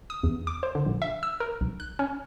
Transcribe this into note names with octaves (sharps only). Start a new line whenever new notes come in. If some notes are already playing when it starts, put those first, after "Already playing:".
D#6
E2
D6
C5
D3
A#1
E5
E6
A#4
B1
F#6
C#4